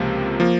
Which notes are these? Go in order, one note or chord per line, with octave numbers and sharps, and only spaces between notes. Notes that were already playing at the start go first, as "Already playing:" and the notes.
Already playing: C#2 C3 F3 A#3
F3 A#3